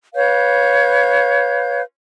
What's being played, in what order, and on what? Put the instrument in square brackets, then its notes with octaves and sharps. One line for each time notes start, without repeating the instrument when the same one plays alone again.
[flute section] B4 C#5 F5 G6